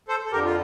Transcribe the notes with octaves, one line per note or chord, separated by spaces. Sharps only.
A4 C5
A4
F2 D3 G4 A#4
F4